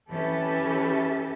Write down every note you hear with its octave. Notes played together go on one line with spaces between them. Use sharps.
E3 C#4 G4 A4 B4 E5